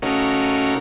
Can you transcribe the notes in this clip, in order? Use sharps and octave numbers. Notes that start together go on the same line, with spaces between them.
C#3 A3 C#4 D#4 F#4 A#4